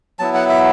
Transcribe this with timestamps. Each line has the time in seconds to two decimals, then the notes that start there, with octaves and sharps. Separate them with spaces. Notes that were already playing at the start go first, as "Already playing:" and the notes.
0.19 F#3 B3 E4 A5
0.34 F#5
0.49 E5